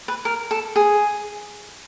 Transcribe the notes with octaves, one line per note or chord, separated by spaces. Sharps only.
B4
A#4
A4
G#4